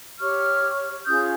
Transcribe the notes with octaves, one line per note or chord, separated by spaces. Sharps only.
G4 C#5 C#6 F6
C#4 F4 G#4 D#6 G6